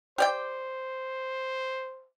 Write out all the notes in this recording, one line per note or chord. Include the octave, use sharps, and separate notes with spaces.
G4 C5 D5 G5